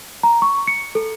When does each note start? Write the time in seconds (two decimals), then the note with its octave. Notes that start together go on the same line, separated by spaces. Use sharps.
0.23 A#5
0.42 C#6
0.67 C#7
0.95 A4